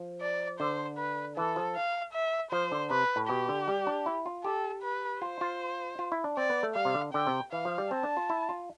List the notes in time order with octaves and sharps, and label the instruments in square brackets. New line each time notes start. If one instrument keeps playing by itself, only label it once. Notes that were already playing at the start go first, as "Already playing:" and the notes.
Already playing: [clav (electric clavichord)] F3
[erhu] D5
[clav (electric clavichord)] D3 [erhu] C5
[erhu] B4
[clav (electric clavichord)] E3 [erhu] A4
[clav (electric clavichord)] F3
[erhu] F5
E5
[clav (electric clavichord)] F3 [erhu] C5
[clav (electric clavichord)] D3
[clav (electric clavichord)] C3 [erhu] B4
[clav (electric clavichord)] A2
[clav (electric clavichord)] B2 [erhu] G4
[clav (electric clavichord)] D3
G3
D4
E4
F4
[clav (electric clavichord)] G4 [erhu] A4
[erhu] B4
[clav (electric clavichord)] F4 [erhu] C5
[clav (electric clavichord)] F4
F4
E4
D4
[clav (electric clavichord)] C4 [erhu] D5
[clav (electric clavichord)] B3
A3
[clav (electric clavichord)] G3 [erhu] F5
[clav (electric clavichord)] C3
D3
[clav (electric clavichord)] D3 [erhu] G5
[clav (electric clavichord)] C3
[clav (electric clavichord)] E3 [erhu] F5
[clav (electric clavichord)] F3
G3
[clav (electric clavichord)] C4 [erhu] A5
[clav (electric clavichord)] D4
F4
E4
F4